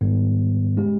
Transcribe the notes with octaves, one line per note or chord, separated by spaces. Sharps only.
G#2 D#3 G3 B3
C#3 G#3 C#4 G4